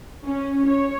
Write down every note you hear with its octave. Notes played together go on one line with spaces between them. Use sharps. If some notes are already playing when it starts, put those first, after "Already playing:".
C#4
C#5